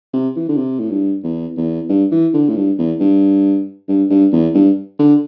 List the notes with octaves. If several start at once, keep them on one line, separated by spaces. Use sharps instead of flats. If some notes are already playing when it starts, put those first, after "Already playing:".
C3
E3
D3
C3
A2
G2
E2
E2
G2
E3
D3
A2
G2
E2
G2
G2
G2
E2
G2
D3